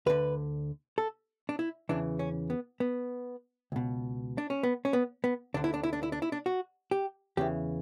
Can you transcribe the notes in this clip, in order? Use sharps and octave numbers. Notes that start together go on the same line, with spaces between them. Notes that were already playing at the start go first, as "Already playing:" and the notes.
D2 D3 B4
A4
D4
E4
E2 C#3 E3 D4
C#4
B3
B3
C#2 B2
D4
C#4
B3
C#4
B3
B3
D2 D3 D4
E4
D4
E4
D4
E4
D4
E4
D4
F#4
G4
E2 C#3 E3 G4